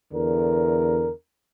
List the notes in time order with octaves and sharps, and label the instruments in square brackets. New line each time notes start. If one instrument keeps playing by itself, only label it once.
[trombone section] E2 D3 A#4